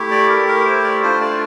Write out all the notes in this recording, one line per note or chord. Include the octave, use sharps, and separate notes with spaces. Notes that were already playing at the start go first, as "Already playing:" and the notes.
Already playing: A3 E4 G4
D5
A#4
A#4
C5
D5
A3 D4 F4 C5
D5